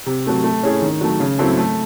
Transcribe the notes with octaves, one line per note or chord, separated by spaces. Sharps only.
C3
F#3 A3 C4
A3
C#4 E4 G#4
D#3
F#3 A3
C#3
F#3 C4 E4 A4
A3